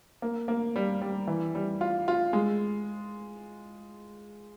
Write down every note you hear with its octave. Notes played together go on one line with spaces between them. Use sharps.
A#3
A#3
G3
G3
E3
G3
F4
F4
G#3